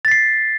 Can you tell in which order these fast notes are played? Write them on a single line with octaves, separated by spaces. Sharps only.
A6 B6 C7